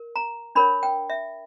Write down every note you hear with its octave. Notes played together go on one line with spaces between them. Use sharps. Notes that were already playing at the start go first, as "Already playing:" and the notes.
Already playing: A#4
A#5
D4 A#4 C#5 B5
G5
E5